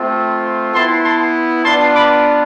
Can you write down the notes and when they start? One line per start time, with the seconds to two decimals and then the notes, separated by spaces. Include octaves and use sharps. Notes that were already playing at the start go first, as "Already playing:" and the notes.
Already playing: A3 C4 F4
0.74 B3 E4 A5 C6
1.04 A5 C6
1.64 B3 D4 F4 A5 C6
1.94 B5 D6